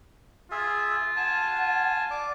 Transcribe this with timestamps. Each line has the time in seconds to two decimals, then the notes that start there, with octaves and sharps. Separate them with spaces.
0.51 F4 G#4 E5
1.17 F#5 G#5 A5
2.11 D5 D6